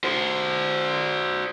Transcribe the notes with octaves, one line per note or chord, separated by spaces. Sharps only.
F#4 C5